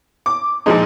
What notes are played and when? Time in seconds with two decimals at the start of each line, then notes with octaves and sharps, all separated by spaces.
0.26 D6
0.66 A#2 F3 G#3 D#4